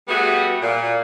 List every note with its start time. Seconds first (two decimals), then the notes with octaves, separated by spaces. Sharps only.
0.08 G3 A3 B3 F#4 G#4
0.62 A#2